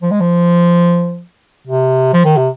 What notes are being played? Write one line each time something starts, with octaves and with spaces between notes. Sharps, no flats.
F3
G#3
F3
C3
F3
D#3
C3